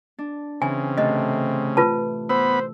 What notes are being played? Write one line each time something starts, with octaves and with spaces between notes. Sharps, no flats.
D4
C#3 E3 C4 G#5
A2 C3 A3 D#5
F4 B4 A5
B3 C5 B5 E6